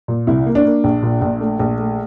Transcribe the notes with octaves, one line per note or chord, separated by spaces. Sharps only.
A#2
C2 E4
A#3
D4
A#3
A#1
A#2
A#1
A3
A#1
A3